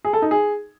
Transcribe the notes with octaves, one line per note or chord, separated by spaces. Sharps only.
G#4
A4
D#4
G#4